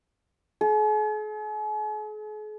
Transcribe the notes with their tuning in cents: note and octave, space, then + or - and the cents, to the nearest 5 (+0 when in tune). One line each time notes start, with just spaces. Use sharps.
G#4 +45